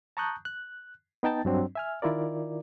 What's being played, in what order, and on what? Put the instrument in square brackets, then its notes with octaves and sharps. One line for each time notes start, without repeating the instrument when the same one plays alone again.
[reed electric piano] A5 A#5 C#6 D#6 F#6 G6
F#6
B3 D#4 G5 A5 A6
G2 F#3 C4 D4
E5 G#5 F6
D#3 E4 F4 A#4 D5